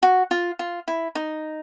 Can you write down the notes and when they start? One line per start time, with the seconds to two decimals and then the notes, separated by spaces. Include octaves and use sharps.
0.03 F#4
0.31 F4
0.59 F4
0.88 E4
1.15 D#4